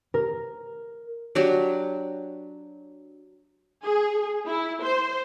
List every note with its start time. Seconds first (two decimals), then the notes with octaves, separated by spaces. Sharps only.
0.14 A#4
1.35 F#3 D4 G4
3.83 G#4
4.47 E4
4.83 C5